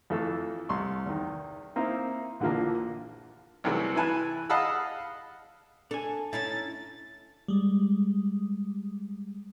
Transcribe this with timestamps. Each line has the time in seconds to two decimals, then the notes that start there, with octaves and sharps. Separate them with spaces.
0.10 F2 E3 A3 A4 F5 E6
0.69 C2 C6 C#6
1.06 E2 D#3
1.76 A#3 C4 D#4 E4 F5
2.40 A#1 D3 E3 F3 A#3
3.64 C2 C3 E3 F#3 A3
3.96 E3 E4 G#5 A5 F#6
4.50 D#5 F5 F#5 A5 B5 E6
5.91 D4 A4 G#5
6.33 C#4 D#4 E4 A6
7.48 G3 G#3